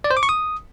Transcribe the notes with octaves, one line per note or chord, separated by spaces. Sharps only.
D5
C5
D6
C#6
D#6